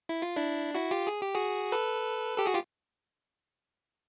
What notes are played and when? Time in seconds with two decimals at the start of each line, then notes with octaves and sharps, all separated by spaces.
0.09 E4
0.22 F4
0.36 D4 E4
0.74 E4 F#4
0.91 F4 G4
1.07 G#4
1.22 G4
1.35 F#4 G#4
1.72 A4 B4
2.38 G4 A4
2.46 F#4 G#4
2.54 F4 G4